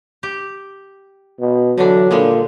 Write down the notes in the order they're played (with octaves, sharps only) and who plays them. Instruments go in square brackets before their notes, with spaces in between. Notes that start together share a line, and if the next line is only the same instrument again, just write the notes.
[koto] G4
[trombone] B2
[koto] D3 E3 D4 [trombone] F#3
[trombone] A#2 [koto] D3 G3 G#3